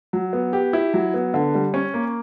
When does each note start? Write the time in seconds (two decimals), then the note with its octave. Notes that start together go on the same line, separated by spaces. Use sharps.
0.13 F#3
0.33 B3
0.53 G4
0.73 E4
0.94 F#3
1.14 B3
1.34 D3
1.55 G3
1.74 C#4
1.94 A#3